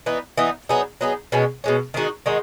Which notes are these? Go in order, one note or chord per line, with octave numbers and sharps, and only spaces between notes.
E3 B3 D#4
E3 B3 D#4
F#3 B3 D#4 G#4
F#3 B3 D#4 G#4
B2 G#3 C#4
B2 G#3 C#4
D#3 G#3 D#4 F#4
D#3 G#3 D#4 F#4